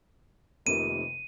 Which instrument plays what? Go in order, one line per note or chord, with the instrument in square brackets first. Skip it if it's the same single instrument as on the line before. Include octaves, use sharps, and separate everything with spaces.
[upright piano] F1 F2 C3 D#3 A#3 [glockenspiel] D#7